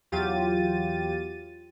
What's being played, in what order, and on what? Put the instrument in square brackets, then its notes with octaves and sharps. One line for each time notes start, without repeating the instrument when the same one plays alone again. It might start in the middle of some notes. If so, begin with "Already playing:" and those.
[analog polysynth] E2 F#3 F4 G4 A6 D#7